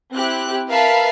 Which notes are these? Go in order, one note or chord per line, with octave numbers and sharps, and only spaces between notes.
C4 E4 G4 F#6
A#4 B4 E5 F5 A5 B5